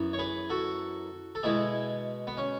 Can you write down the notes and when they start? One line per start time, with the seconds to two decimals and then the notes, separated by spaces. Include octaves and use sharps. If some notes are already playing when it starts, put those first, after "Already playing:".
Already playing: F#2 E3 B3
0.13 C#5
0.19 G#4 B4
0.50 F#4 A4
1.35 A4
1.43 B2 G#3 B3 E4 G#4
2.27 B3
2.37 C#4